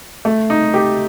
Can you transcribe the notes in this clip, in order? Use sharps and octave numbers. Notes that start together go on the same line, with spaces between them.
A3
D#4
G4